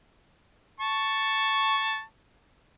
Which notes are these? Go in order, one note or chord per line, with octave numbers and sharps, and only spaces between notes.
A5 C#6